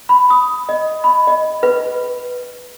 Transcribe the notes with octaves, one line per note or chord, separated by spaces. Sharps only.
B5
D#6
D#5
B5
D#5
B4